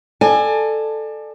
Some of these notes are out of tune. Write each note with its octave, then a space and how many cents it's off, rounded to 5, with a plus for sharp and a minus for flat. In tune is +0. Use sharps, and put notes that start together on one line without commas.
A4 +0 D5 +30 G#5 +0